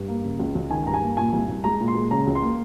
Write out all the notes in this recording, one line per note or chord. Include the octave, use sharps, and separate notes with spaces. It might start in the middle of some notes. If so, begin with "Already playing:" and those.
Already playing: G2
A#3
C#3
C#2
C#2
D#3 G#5
G2 A#5
G#5
A#3
A#2 G#5
C2
C2
G#3 A#5
A#2
C6
G#3
C#3 A#5
C#2
C6
A#3